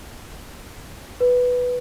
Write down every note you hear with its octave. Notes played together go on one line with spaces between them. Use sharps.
B4